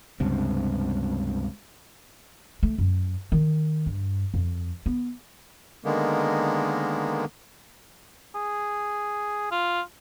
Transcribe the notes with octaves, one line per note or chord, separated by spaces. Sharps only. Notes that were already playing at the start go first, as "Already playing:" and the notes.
C#2 G2 C3
A3
F#2
D#3
G2
F2
B3
D3 D#3 G#3 A#3 B3
G#4
F4